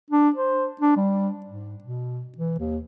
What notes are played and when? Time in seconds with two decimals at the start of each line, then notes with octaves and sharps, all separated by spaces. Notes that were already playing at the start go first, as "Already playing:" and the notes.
0.10 D4
0.36 C5
0.81 D4
0.97 G3
1.46 G#2
1.84 B2
2.38 E3
2.59 D#2